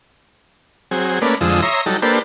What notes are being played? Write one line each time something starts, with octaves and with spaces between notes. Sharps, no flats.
F#3 C4 G#4
A3 A#3 C#4 B4 D5
F2 D3 F3 G#3 D#6 E6
C#5 E5 A#5 C6 D#6
F#3 G3 D#4 A4
A#3 D4 G4 A4 B4 C5